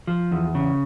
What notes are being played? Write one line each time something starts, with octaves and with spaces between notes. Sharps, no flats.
F3
E2
C#3